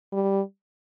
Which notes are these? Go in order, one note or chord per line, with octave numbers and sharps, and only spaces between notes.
G3